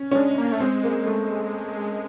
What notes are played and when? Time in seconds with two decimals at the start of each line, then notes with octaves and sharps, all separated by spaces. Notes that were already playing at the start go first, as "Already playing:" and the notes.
Already playing: C#4
0.11 C#4
0.15 G#3 D4
0.38 A#3
0.52 A3
0.60 G#3 C4
0.84 A#3
1.06 A3